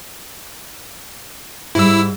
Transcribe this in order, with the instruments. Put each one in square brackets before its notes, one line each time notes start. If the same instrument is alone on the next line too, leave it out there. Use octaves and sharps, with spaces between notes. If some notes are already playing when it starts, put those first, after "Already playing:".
[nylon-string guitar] G#2 G3 [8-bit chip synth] E4 E6